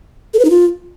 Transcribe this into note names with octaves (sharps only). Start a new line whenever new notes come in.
A4
B4
D#4
F4